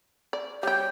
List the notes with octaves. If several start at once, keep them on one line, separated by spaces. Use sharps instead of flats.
D5
G3 G4 C#5 G6